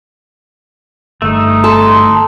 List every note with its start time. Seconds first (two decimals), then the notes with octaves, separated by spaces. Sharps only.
1.22 G1 A3 D#4
1.64 A4 C6